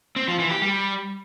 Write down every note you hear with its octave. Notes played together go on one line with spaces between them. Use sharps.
C4
F3
E3
G4
G3